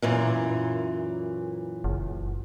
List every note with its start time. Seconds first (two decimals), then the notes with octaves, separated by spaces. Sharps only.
0.02 F#2 A#2 E3
1.84 F#1